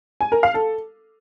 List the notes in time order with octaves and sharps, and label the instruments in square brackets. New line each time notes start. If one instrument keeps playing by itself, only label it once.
[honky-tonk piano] G#5
A#4
F5
A4